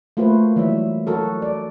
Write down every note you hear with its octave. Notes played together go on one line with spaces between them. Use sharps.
A3 A#3 F4 F#4 B4 C5
E3 F#3 G3 A#3 E5
F#3 F#4 A4 A#4
D5